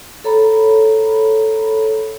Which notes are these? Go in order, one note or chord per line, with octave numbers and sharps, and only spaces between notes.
A4 C#5 A#5 B5